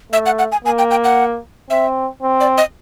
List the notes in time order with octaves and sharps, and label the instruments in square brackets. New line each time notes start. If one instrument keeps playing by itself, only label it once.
[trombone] A3 [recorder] E5
[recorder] F#5
F#5
G#5
[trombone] A#3 [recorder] G#5
[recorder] G5
G5
F#5
[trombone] C4 [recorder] E5
[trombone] C4
[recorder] D5
D#5